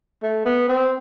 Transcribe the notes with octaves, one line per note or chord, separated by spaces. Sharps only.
A3
B3
C4